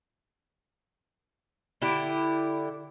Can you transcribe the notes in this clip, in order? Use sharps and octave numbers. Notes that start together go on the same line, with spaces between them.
D3 E4 G4